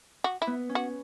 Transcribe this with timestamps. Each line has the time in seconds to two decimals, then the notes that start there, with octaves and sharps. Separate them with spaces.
0.24 F#4
0.42 E4
0.47 B3
0.69 C#4
0.75 F#4